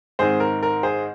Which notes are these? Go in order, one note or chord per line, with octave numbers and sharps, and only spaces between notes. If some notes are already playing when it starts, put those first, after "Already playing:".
G#2 D#3 C4 G#4 C5
A#4
A#4
G#4 C5